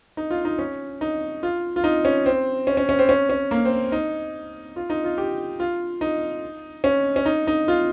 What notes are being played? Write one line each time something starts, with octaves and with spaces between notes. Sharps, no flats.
D#4
F4
D#4
C#4
D#4
F4
F4
D#4
C#4
C4
C#4
C#4
C#4
C4
C#4
C#4
A#3
C4
D#4
F4
D#4
F4
G4
F4
D#4
C#4
C#4
D#4
D#4
F4